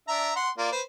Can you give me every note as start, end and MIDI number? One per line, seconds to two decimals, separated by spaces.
0.08 0.31 62
0.08 0.31 76
0.08 0.31 82
0.36 0.50 78
0.36 0.50 84
0.58 0.69 58
0.58 0.69 65
0.58 0.69 74
0.72 0.81 71
0.72 0.81 72